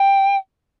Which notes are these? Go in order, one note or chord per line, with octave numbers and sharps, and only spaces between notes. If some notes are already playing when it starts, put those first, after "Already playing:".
Already playing: G5